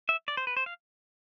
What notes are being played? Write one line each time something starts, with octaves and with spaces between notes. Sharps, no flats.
E5
D5
C5
B4
C5
F5